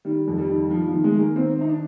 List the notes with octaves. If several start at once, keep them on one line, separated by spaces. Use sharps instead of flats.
D#3 G3
F2
G3
D#3
D#3 F3
F3
D#3
G#3
D#3 A#3
D#3 C4
D#3 D#4
D4